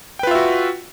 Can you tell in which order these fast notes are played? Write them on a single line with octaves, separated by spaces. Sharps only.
G5 B4 F4 E5 F#4